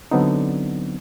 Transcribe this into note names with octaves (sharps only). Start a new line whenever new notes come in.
D3 F#3 B3 C4 D#4